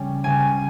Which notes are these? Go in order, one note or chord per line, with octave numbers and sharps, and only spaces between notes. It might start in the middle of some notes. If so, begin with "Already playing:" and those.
Already playing: C#3 G3 C#4
C#2 C#3 G3 C#4 G#5